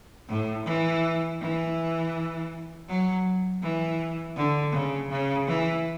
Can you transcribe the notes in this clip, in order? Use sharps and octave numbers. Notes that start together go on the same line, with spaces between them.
A2
E3
E3
F#3
E3
D3
C#3
C#3
E3